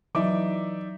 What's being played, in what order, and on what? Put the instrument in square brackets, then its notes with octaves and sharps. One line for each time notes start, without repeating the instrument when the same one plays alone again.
[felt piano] E3 D6 [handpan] F#3 [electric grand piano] D#4 D5 E5